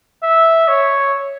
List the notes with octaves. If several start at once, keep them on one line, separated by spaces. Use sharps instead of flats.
E5
C#5